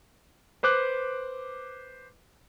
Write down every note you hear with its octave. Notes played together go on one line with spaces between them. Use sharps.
B4 C5 D6 F#6